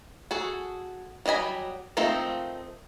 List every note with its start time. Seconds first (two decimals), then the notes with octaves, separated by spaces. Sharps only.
0.31 F#4 G#4 A4
1.26 F#3 G3 D#5 G#5 B5
1.97 F3 A3 A#3 C4 D#4